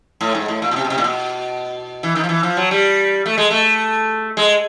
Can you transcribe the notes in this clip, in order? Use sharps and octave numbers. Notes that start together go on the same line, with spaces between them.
A2
G#2
A2
A#2
B2
C3
B2
C3
A#2
B2
E3
D#3
F3
E3
F3
F#3
G3
A3
G#3
A3
G#3